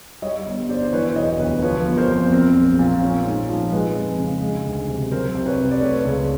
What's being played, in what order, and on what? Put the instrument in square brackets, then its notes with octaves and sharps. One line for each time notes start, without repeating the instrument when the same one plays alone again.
[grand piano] G3 C#5 D#5
G1
G2 C5 D5
C5
E3 B4 C#5
E1 C#5 D#5
D2 B4
F3 B4 C#5
G1
A#4 C5
F2
C4 A#4
A#1
A#2
C#4
G#2
F3
G#3 B4
F2
C#3
G#3
D2
C3
F#3 A#4 C5
C2
B4 C#5
C3
D5
A3 B4 C#5
C#2